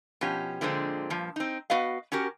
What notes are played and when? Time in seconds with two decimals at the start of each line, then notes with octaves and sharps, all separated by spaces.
0.21 B2 F3 C#4 G4
0.61 A#2 D3 F3 G#3 A3 C4
1.10 G2 A#2 F3
1.36 C4 D#4
1.70 B3 F#4 B4 D#5 F5
2.12 C#4 F#4 G4 A#4